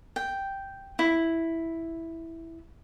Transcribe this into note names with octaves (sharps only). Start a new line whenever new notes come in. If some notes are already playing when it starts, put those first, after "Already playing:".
G5
E4